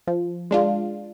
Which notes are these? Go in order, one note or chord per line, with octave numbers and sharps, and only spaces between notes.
F3
G#3 D4 F4